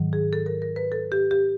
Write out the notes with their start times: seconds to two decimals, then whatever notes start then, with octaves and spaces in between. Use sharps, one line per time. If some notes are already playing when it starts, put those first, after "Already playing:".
Already playing: G#2 D#3 F#3
0.13 G#4
0.33 A4
0.46 A#4
0.62 A#4
0.76 B4
0.92 A4
1.12 G4
1.31 G4